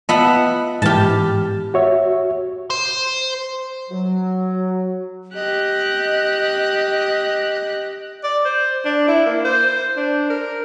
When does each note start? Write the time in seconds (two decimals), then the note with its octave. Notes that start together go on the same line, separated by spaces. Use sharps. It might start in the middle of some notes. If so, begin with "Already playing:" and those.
0.09 B3 F4 D#5 E5 F#5 A5
0.82 G#2 E3 G4 A5 F6
1.74 F#4 C#5 E5
2.70 C5 C6
3.90 F#3
5.35 G4 D#5 F#6
8.23 D5
8.45 C5
8.85 D4
9.08 E4
9.26 A#3
9.45 C5
9.97 D4
10.30 A#4